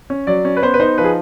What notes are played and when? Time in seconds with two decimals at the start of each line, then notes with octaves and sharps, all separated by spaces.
0.10 C#4
0.27 F#3 D5
0.45 C#4
0.57 B4
0.62 B3 C5
0.74 B4
0.80 D#4 C5
0.98 F3 B4
1.04 G#4